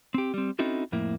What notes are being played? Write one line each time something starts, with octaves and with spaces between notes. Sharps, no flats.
C4 G4
G3 C4
C4 C#4 D#4 E4 F#4 A4
F2 A2 A#3 E4